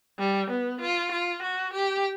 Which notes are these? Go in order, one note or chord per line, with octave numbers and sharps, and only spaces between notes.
G3
B3
F4
F4
F#4
G4